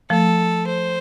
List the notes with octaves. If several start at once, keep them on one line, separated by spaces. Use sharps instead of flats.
F3 A3 A4
C5